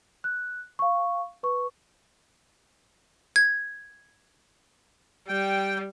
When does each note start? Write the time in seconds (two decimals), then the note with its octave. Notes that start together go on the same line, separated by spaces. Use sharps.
0.24 F#6
0.79 F5 C#6
1.43 B4 C#6
3.36 G#6
5.28 G3 G5